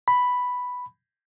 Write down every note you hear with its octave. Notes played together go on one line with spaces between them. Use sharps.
B5